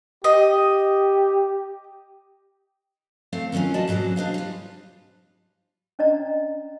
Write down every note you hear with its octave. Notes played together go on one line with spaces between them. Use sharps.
G4 D#5
A3 C4 C5 F5
D#3 F#3 C4 C#4 F4
G3 F#4 D5 D#5 A5
G#2 B2 F#3 G#3 C#4
D4 C5 D#5 F5
G3 F4
C#4 D4 D5 D#5 A#5